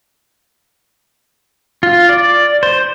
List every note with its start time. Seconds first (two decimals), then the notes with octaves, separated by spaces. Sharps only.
1.83 F4
2.09 D5
2.63 C5